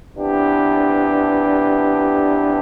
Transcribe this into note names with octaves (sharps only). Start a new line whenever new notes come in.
C3 E3 B3 D4 G4